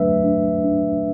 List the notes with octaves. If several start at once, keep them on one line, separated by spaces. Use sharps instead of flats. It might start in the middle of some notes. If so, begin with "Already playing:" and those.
Already playing: F#3 A3 D4 B4 E5
D4
D4